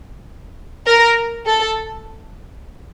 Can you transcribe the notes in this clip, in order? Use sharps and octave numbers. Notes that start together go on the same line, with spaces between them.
A#4
A4